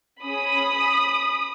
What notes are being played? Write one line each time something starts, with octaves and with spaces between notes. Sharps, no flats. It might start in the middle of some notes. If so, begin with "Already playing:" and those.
C#4 G#4 B5 D#6